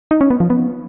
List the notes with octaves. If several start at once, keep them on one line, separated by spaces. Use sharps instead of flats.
D#4
C#4
B3
F3
B3